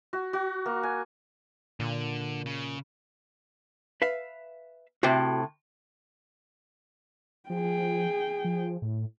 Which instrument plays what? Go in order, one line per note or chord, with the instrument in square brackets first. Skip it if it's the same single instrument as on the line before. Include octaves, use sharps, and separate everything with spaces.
[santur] F#4
F#4
A#3
G#5
[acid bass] A#2 [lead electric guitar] D3
[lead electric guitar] C#3
[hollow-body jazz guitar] B4 E5 F5
[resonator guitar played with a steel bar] A2 C3 [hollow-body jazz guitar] F#4 C5 G5
[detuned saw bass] F3 [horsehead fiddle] G#4 G5
[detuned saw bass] F3
A2